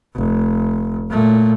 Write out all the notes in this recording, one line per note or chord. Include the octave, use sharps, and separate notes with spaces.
F1
A#2 A3